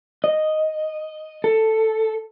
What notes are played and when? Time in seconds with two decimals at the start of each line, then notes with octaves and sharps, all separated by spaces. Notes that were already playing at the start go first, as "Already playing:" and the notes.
0.24 D#5
1.44 A4